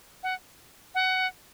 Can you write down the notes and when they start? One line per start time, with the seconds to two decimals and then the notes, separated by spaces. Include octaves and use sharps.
0.23 F#5
0.95 F#5